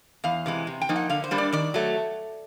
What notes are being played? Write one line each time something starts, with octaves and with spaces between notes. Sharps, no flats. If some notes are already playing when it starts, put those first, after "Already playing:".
E2 F5
C3 E3 G#3
C3
G5
F3 A#3 D#4
F#5
D3 F5
C5
G3 A#3 D4
D5
D#3 D5
F#3 A3